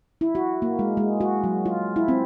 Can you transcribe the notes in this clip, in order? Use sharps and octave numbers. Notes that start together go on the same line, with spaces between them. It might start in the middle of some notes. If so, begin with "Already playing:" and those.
E4
F#4
A#3
G#3
G#3
F#4
F#3
F4
E4
C4